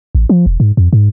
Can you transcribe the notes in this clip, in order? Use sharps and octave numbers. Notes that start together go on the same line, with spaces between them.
A1
F3
E1
G#2
F2
G#2